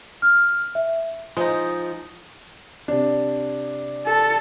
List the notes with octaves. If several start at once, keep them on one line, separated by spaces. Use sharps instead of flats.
F6
E5
F3 G#3 D#4
C3 D4
A4